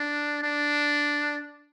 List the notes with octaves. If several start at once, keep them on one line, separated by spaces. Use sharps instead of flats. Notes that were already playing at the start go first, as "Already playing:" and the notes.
Already playing: D4
D4